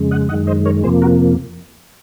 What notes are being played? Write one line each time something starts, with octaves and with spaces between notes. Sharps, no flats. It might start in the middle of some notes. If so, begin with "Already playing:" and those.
Already playing: F2 C#3 G#3
D#5 F#5
F#2 D#3 G#3 D#5 F#5
C5 D#5
A#4 C#5
F2 C3 F3 A#3 G#4 C5
F#4 A#4